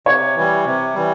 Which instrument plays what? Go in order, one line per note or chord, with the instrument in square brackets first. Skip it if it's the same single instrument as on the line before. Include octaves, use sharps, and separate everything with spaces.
[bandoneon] C3 [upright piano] C#5
[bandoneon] E3 G3
C3
E3 G3